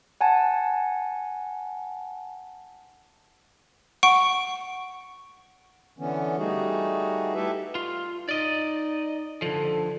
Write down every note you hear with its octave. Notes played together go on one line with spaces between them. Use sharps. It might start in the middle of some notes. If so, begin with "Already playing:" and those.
F#5 G#5 A5
F#5 C#6 D7
D3 E3 B3 C#4
G3 A3 D#4 F#4 G#4
E4 G4 A4 B4 E5
F4
D#4 D5 D#5
D3 F3 A4